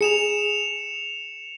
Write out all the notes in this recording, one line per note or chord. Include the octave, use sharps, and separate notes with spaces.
G#4 C#7 E7 F7